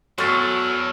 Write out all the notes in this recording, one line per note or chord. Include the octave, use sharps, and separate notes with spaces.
E2 F#3 A4 C#6 F6 A6